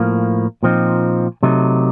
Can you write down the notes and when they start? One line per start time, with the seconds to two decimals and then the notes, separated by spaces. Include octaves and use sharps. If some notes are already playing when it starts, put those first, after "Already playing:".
Already playing: A2 F3 A#3
0.63 A#2 F3 C4 D#4
1.43 C3 F#3 A3 D#4